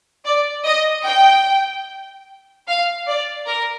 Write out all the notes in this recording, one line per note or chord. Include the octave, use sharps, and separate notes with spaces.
D5
D#5
G5
F5
D5
A#4